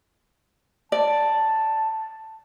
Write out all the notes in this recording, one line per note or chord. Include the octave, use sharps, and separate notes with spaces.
D5 A5